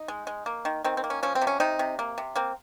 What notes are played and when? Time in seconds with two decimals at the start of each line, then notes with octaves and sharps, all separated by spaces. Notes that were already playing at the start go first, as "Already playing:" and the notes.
Already playing: D#4
0.08 G#3
0.27 G#3
0.46 A#3
0.65 D#3
0.84 D#3 C4
0.97 C4
1.04 A#3
1.10 C#4
1.23 F3 C#4
1.35 C4
1.42 C3
1.47 C#4
1.60 C3 C4 D#4
1.79 C3
1.99 A#3
2.18 C3
2.36 A#3 C4